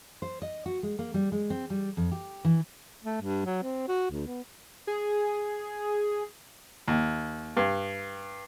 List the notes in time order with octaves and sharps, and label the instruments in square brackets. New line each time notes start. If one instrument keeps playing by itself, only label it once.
[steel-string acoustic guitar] C5
D#5
F#4
G#3
A#3
G3
G#3
C4
G3
F2
G4
E3
[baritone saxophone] A3
G2
F#3
C4
F#4
D2
B3
[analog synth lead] G#4
[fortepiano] D#2
G2